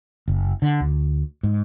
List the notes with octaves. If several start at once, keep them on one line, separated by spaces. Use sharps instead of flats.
F#1
D3
D2
G#2